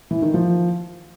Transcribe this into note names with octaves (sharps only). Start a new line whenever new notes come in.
E3
D#3
F3